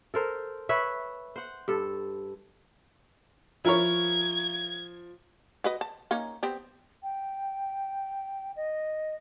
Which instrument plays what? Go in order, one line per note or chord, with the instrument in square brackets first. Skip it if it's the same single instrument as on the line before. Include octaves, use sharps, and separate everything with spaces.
[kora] A4 A#4 C5
B4 C#5 E5
C5 F#5
G2 A4
[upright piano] F3 [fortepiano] E4 A#4 C#5 [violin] G#6
[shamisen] F#4 B4 D#5
A5
A#3 C#4 D#4
B3 C4 G4
[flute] G5
D#5